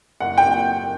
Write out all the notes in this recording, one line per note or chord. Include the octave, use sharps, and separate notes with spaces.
F#1 F#5
G5